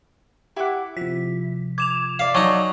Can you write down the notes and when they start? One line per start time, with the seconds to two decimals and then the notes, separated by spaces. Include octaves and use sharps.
0.57 E4 G4 F#5 D6
0.97 C3 F3 B6
1.78 D6 G#6 E7 F7
2.19 D5 E5 F5
2.35 F#3 D#4 G#5 A5 C#6 F#6